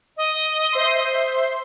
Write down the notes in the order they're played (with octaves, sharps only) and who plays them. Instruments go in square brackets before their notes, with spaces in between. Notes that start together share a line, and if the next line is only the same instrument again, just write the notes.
[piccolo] D#5
[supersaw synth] C5 E5 C6